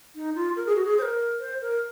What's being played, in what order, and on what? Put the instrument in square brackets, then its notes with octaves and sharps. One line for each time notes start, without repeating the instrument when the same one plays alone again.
[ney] D#4
F4
A#4
G#4
F#4
G#4
C5
A#4
C5
A#4